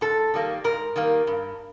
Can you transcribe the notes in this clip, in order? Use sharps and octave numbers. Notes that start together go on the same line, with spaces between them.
G#2 A4
D#3 G3 A#3
G#2 A#4
D#3 G3 A#3
G2